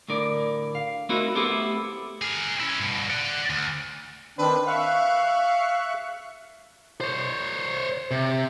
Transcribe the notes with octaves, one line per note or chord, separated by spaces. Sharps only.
D2 A2 A#4 D5
F5
A3 C4 D#4 E4 F#4 A#4
A3 B3 C4 E4 G4 A4
G#4 A#4
C#4 E4
G2 B2
D5 F#5
D2
D#3 C4 D4 B4
E5 F5 C#6 F#6
C5 C#5
C3